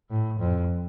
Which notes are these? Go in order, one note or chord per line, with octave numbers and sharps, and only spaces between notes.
A2
F2